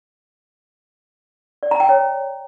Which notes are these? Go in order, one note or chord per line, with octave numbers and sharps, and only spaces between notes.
D5
A#5
G5
C#5